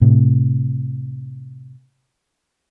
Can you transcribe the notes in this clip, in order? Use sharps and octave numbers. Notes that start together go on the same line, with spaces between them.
A2 C3